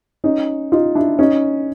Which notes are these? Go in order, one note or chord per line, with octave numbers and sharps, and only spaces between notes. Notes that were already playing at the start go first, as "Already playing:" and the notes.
C#4 D#4
D#4 F4
D4 E4
C#4 D#4